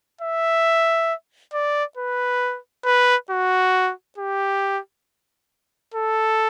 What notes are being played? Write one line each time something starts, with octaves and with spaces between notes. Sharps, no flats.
E5
D5
B4
B4
F#4
G4
A4